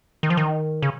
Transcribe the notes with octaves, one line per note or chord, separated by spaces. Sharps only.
D#3
F3
D#3
C#3